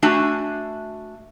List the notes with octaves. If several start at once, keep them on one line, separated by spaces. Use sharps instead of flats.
A3 D4 F#4 E5 G#5